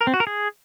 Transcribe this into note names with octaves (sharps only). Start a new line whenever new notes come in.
A#4
C4
F#4
A#4
G#4